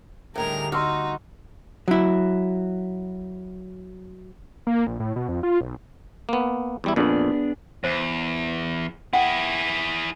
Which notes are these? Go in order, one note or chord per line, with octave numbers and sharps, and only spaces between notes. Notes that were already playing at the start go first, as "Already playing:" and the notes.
D2 A2 D3 D#3 G3 G#4 A#4 F7
D#4 F#4 C6 E6 F6
F#3 E4
A#3
A#1
A2
B2
F2
F4
B1
A#3 B3
E2 G3 E4
F2 A#2 B3 D4 G#4
E2 C5
E4 G#4 F#5 G5